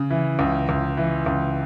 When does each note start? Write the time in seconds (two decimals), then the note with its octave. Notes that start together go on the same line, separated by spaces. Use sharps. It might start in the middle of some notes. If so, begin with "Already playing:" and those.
Already playing: C#3
0.10 E3
0.39 C#2
0.69 C#2
0.97 E3
1.26 C#2